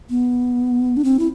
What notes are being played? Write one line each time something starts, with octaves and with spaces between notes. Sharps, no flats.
B3
D4
C4
E4